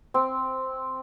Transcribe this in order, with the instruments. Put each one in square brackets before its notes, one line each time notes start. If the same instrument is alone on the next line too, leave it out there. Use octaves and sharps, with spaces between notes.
[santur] C4